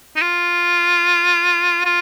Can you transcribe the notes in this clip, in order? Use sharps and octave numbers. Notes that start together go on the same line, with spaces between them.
D#4
F4
F4